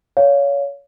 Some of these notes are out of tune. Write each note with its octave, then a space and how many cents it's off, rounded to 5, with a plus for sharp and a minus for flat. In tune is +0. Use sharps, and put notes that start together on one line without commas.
C#5 +25 F5 +0